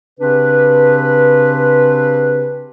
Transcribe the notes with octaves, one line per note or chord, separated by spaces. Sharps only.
C#3 C4 D4 G4 B4